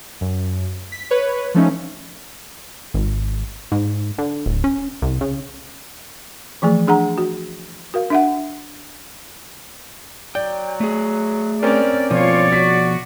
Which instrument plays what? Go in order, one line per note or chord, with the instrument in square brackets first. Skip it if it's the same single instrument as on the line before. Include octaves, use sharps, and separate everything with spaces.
[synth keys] F#2
B6
B4 C#5
F3 A3 C#4 D#4
[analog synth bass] G#1
G#2
D3
D1
C#4
C2
C#3
[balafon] E3 F3 A3 G#4
D4 G#4 F#5 A#5
F#4
F#4 A#4 F5
D4 E5 F#5
[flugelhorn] F#3 [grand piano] D5 [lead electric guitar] G5
[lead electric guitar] A3 G#4
[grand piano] C4 C#4 A#4 [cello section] D5
[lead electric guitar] B2 F3 [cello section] F4 C#5 [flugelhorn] D5
[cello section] F#4 [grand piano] B6